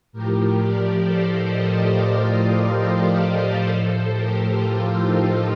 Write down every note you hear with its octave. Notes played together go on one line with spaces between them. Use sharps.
A2 F3 G4 A#4
A#4 D5
A4 C5
C5 D#5
D5 F5
C5 D#5
A#4 D5
A2 F3 A4 C5
G4 A#4
F4 A4
D#4 G4